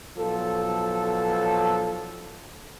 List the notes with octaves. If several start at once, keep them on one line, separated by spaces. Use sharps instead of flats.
B1 F3 A4